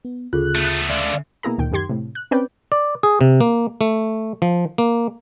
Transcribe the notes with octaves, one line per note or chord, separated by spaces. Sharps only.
B3
D2 C#3 F4 G#4 A4 F#6
A3 B3
C#2 D3 D5 E5 F5
B2 A#3 E4 G#4 A#5
D2 A#2 D#3 G5
F#2 D#3 G4 C6 G#6
A2 C3
F#6
C4 C#4 B4 D5 G5
D5
G#4
C3
A#3
A3
F3
A#3